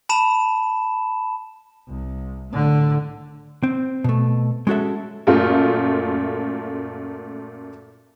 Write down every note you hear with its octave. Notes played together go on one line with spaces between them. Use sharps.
A5 B5 E7
C2
A2 D3
C4
B2 A3
G#3 C#4 F#4 G#4 A4 E5
F#2 A#2 A3 F4